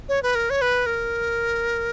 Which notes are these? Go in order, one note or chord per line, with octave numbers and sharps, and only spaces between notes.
C#5
B4
A#4
C#5
B4
A#4